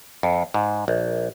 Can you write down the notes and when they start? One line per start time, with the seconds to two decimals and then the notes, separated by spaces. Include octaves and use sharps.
0.23 F2
0.54 G#2
0.88 A#1